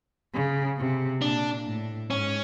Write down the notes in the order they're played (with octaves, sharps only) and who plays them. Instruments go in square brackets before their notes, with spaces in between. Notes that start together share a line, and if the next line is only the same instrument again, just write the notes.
[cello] C#3
C3
[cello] A#2 [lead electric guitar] D4
[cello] A2
[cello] G#2 [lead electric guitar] C#4